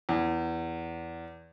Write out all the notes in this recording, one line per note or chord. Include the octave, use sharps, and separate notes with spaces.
E2